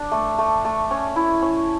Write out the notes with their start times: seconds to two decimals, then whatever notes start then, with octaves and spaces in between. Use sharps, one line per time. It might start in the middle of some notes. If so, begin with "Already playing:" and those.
Already playing: D4
0.11 A3
0.38 A3
0.65 A3
0.91 C#4
1.16 E4
1.42 C#4